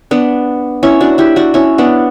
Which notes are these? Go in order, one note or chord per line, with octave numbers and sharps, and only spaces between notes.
B3 D4
C#4 E4
D4 F#4
E4 G4
D4 F#4
C#4 E4
B3 D4